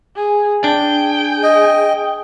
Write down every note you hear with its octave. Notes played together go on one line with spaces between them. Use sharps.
G#4
D4 G#4 G5
D#5